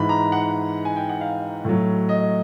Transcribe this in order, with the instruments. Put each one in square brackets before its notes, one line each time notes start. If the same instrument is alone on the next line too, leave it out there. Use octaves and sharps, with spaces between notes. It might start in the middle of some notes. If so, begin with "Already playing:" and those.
Already playing: [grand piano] G#2 E3 B5
A#5
F#5
G#5
G5
F#5
F5
A2 F#3
D#5